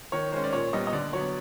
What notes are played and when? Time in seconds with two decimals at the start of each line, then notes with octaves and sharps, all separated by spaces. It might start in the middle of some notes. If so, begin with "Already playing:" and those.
0.12 D#3 C#5
0.32 G#3 C#4 C5
0.44 D5
0.53 A#2 C#5
0.73 G3 B3 D#5
0.87 D#5
0.93 D3 D5
1.13 F#3 B3 C#5